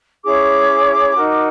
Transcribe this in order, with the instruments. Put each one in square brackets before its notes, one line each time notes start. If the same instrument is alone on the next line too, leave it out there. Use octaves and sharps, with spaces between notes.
[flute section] C#4 E4 G#4 C#5 D6
D#4 F#4 A#4